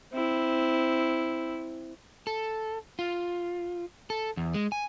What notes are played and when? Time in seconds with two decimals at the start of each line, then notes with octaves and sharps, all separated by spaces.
0.13 C4 E4
2.27 A4
2.99 F4
4.10 A4
4.37 E2
4.54 G#3
4.72 G#5